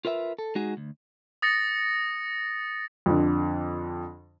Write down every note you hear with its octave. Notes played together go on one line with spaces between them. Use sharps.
F4 A#4 B4 D#5 E5
A4
G#3 D#4 F#4 G#4
D2
D#6 A6 A#6 C#7
F2 D3